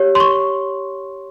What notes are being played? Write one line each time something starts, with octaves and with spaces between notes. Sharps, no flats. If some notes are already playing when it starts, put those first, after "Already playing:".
Already playing: G4 C#5
C6
C#6